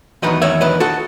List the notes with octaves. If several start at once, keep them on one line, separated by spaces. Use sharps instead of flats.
E2 D#3 F#3 B4 D#5
C#5 E5
B4 D#5
F#4 A4